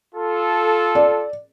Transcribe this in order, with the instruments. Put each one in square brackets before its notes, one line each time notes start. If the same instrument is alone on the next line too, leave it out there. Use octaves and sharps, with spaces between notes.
[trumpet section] F4 A4
[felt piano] D5